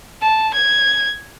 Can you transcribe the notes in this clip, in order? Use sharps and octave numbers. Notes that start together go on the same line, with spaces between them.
A5
G#6